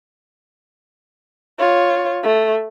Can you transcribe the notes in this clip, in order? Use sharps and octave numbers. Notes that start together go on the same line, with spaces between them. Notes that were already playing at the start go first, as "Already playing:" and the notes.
F4 C#5
A3